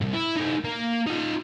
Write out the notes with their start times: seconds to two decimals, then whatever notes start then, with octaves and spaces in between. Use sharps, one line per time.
0.01 C2 G#2
0.14 E4
0.36 A3 D#4
0.64 A#3
1.07 D#4 F4